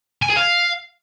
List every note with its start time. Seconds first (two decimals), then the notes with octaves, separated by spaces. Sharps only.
0.22 G#5
0.29 G#4
0.36 F5